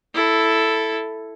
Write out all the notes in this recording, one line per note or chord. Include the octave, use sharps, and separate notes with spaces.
E4 A4